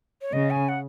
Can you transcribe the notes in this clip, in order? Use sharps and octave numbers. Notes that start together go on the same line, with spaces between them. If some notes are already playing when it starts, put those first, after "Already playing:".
C#5
C#3 D#5
G#5
F#5